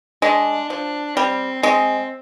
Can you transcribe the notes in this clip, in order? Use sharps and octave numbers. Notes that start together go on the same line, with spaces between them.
G#3 D4
F3 D4
G3 C4
G#3 C4